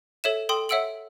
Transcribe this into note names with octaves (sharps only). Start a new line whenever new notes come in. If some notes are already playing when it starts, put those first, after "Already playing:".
A4 C#5 E5 E7
A4 G5 C6 D#6
C#5 E5 F#5 E6 D7 F#7